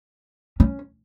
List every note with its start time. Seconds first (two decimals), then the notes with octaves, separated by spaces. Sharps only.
0.60 C#4